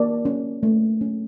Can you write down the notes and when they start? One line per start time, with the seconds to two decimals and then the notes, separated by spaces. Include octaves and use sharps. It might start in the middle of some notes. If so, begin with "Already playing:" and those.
Already playing: A#3 D5
0.25 C#4
0.63 A3
1.01 C#4